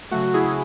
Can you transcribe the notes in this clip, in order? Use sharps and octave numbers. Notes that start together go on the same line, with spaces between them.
C#3 F#3 A3 F#4
E4 G#4